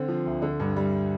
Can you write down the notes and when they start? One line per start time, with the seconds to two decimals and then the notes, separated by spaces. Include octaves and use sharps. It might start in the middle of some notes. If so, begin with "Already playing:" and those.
Already playing: D3 C4
0.08 F3
0.26 D2
0.42 D3
0.60 G2
0.76 G3